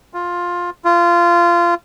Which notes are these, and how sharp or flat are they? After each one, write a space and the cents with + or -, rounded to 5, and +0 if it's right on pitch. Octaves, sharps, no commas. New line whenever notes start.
F4 +10
F4 -20